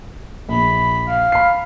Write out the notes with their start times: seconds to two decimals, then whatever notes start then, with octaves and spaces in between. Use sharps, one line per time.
0.49 A#1 B5
1.07 F5
1.32 B5 C7